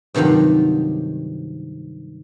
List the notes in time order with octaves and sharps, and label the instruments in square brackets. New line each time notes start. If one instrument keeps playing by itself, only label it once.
[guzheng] G2 C3 D#3 F3 F#3